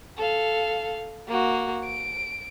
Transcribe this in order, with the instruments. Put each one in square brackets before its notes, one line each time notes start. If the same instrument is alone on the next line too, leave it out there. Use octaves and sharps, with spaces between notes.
[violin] A4 F5
A#3 F#4
D7